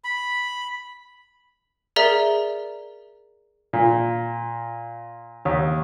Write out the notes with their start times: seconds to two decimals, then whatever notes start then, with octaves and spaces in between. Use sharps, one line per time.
0.04 B5
1.96 G#4 A#4 D5 E5 A#5
3.73 A#2
5.45 D#2